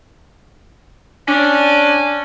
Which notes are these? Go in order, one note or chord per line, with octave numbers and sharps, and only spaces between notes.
C#4 D4